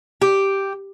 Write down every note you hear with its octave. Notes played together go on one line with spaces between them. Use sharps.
G4